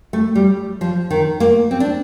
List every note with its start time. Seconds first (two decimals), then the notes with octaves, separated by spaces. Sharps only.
0.13 A3
0.35 G3
0.81 F3
1.11 D#3
1.40 A#3
1.71 C4
1.80 D4